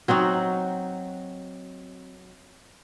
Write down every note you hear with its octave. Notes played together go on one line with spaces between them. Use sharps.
F#3 C4 D#4 F#4